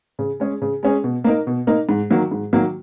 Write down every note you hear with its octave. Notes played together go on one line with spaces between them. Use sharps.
C#3
G#3 C#4 G#4
C#3
G#3 C#4 G#4
B2
A#3 D#4 A#4
B2
A#3 D#4 A#4
G#2
D#3 F#3 A#3
G#2
D#3 F#3 A#3